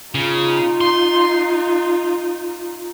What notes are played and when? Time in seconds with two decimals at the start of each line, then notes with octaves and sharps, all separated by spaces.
0.15 C#3 D#4 F4
0.81 C6